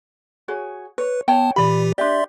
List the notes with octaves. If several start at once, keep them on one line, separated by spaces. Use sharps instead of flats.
F#4 G#4 C#5
B4 C#5
B3 C#5 G5 A5
A#2 E3 G4 D5 B5
D4 G4 D5 E5 C6